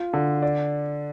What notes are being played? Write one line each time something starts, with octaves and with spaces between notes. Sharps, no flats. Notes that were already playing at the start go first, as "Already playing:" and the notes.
Already playing: F4
D3
D5